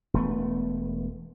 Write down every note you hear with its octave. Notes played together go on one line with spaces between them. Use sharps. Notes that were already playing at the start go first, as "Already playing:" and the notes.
E1 A3 B3